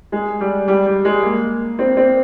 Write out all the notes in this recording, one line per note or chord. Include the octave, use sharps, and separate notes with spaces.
G#3
G3
G3
G3
G#3
A#3
C4
C4